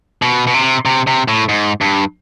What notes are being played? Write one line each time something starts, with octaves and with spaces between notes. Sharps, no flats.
B2
B2
C3
C3
C3
A2
G#2
G2